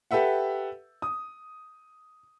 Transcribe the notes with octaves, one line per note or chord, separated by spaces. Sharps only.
G4 A4 B4 E5 F#5
D#6